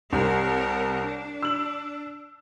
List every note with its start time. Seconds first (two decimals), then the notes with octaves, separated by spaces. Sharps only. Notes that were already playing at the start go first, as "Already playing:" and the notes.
0.13 C2 C4 A#4 C#5
1.04 D4
1.42 E6 F#7